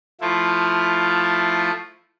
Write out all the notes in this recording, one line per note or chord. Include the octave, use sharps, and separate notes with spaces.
F3 A3 E4 F4